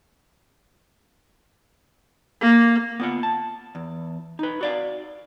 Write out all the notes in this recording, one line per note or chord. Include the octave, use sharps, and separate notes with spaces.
A#3
B3 F4 F#5
A5
E2
D#4 B4
F#4 D5 F5